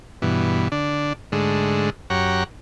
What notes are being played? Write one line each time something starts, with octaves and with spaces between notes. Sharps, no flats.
G2 B2 E3
D3 D4
G#2 D3 G#3 A3
F#2 G4 C#5 F#5 A#5